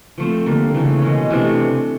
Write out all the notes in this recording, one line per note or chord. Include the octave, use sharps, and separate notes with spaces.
F3 A3 C4
D3 G3 A#3
C#3 E3 A3
B2 G#3 C#4
C3 E3 A3 D4